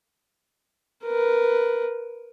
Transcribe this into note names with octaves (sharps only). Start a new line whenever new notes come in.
A#4 B4